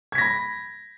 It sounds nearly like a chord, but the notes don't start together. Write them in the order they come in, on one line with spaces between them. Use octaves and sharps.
G#6 B6 A#6 B5